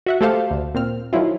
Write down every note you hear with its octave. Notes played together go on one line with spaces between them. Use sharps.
F#4 E5 F#5
A3 G4 A4 C5 F5 A5
D2
A#2 C4 F6
D#3 F3 F#3 E4 F4